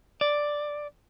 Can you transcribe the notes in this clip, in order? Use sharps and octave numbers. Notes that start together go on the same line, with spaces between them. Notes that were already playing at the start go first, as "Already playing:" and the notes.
D5